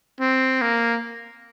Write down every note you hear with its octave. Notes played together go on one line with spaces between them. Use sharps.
C4
A#3